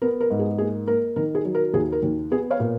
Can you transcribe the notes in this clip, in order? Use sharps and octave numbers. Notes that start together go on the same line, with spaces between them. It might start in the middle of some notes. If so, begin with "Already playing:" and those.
B3 A#4
A#4
G#2
G#4
A#3 G#4
A#3 A#4
D#3 A#4
G#4
F#3
A#4
D#2 G#4
A#4
D#2
B3 G#4
C#5 F5
A#2